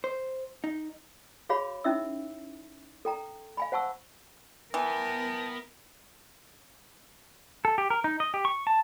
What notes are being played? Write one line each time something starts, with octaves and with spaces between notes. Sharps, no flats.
C5
D#4
F#4 G#4 C#5 F5 B5
C#4 D#4 E4 E5 D#6 E6
A4 G5 A#5
F5 G#5 B5
C5 F#5 A5 C#6 E6
E3 B3 A#4 G5 A5
A4
G4
A#4
D#4
D#5
G4
C#6
A5